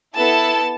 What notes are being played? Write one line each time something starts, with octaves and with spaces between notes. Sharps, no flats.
B3 E4 A4 A5